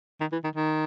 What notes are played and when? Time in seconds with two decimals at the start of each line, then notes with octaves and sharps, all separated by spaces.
0.20 D#3
0.32 E3
0.44 D#3
0.55 D#3